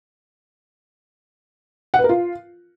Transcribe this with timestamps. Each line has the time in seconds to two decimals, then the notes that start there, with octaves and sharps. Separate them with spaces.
1.94 F#5
1.99 B4
2.04 A#4
2.09 F4